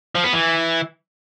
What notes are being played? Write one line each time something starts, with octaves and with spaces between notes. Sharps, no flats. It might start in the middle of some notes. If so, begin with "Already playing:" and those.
F3
B3
E3